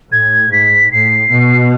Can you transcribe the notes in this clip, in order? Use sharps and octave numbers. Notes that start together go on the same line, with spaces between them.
A2 G#6
G#2 B6
A2 C7
B2